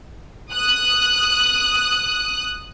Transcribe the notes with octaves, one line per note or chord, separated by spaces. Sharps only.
D#6 F#6